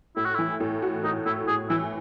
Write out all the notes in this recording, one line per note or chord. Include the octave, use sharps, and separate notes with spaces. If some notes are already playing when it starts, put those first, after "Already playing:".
A2 E4
F#4
E3 E4
A2
F#4
A2 D#4
A2 E4
A2 G#4
E3 E4